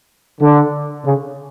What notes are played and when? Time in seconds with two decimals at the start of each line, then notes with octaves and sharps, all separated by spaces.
0.41 D3
1.04 C#3